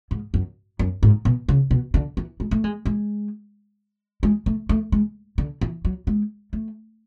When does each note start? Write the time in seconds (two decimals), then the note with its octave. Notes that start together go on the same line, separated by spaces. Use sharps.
0.11 G#2
0.34 F#2
0.79 F#2
1.03 G#2
1.25 B2
1.48 C#3
1.71 B2
1.94 D3
2.17 E3
2.40 G#3
2.51 A3
2.64 G#3
2.85 G#3
4.23 G#3
4.46 A3
4.69 A3
4.92 G#3
5.38 D3
5.61 E3
5.85 F#3
6.07 G#3
6.53 A3